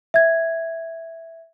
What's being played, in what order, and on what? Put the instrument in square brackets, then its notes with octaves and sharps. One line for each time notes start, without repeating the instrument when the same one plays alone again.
[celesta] E5 G#6